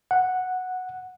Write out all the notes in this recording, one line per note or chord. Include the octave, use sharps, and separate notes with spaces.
F#5